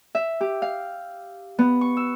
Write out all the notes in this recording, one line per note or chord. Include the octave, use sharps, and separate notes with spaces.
E5
G4
F5
B3
C#6
E6